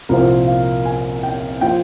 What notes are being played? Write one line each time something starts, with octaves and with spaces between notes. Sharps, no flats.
C2 A#2 F3 C4 F4 A#4
F5
G#5
G5
F3 A#3 F4 G5